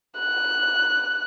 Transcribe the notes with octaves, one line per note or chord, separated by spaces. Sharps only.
F#6